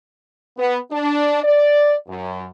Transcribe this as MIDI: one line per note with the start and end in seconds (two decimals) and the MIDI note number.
0.58 0.78 59
0.91 1.43 62
1.44 1.95 74
2.07 2.47 42